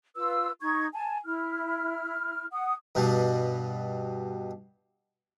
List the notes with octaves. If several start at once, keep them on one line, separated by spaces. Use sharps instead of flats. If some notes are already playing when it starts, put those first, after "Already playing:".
F4 B4 E6
D#4 C#6 G#6
G#5 A5
E4 F6
F#5 D#6
G2 B2 G3